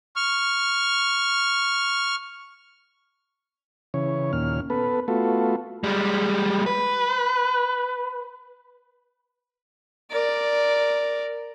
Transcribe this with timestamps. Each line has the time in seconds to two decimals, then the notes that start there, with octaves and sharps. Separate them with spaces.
0.16 C#6 F6
3.94 C#3 E3 C#5
4.33 D#2 A#2 C#4 F6
4.70 B3 A4 B4
5.08 A3 B3 F4 F#4 A4
5.84 G3 G#3
6.66 B4
10.11 A#4 D5